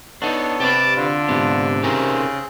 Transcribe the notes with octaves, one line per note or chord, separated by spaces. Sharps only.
B3 D4 D#4 A4 C#5
C3 G4 B4 A5 D6
D3 D4 F4
G#2 C3 B3
C#3 C4 C#4 D#4 G#4 A#4